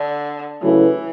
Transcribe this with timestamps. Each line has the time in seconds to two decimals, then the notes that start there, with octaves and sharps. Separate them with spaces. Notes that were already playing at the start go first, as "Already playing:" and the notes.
Already playing: D3
0.62 C#3 E3 F#3 A3 E4 B4